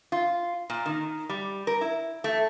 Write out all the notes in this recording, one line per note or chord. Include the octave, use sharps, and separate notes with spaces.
F4
A#2
D#3
G3
A#4
E4
A3